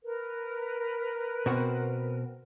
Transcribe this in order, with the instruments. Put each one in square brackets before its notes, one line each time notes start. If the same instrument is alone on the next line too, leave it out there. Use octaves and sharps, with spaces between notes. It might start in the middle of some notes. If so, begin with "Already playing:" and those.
[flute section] A#4 B4
[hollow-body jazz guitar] B2 C4 F#4